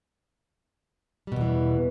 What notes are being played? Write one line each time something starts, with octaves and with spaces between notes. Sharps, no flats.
E2 B2 E3 G3